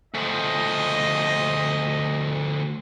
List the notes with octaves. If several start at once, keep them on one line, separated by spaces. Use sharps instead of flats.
D2 F3 D#5